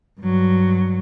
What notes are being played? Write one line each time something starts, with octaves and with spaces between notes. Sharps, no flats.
G2 F#3